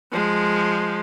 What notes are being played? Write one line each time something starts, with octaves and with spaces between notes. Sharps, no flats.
F3 G#3